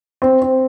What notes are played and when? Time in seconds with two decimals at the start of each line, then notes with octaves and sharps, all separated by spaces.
0.22 C4
0.42 C4